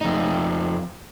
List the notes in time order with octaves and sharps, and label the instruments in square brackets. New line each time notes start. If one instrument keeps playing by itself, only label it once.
[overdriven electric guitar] F2 D#4